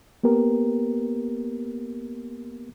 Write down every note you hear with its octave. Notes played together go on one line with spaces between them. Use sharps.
A#3 B3 G4 A#4